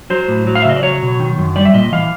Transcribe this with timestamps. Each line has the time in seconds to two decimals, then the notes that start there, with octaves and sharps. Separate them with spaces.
0.10 F#3 C5
0.28 A2
0.47 F#3
0.55 F5
0.62 E5
0.65 C#3 D#5
0.76 D5
0.83 F#3 C#5
1.02 B2
1.20 D#3
1.38 F#2
1.56 G3 D5
1.65 E5
1.74 A#2 D#5
1.92 E3 F5